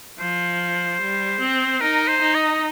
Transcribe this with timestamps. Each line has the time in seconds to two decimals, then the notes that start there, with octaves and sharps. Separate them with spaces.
0.19 F3 C5
1.00 G3
1.40 C4
1.80 D#4 A#4
2.07 C5
2.21 D#4
2.35 D#5